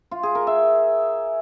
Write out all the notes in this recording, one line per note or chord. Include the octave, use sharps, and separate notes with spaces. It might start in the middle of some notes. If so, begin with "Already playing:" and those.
F4
G#4
A#4
E5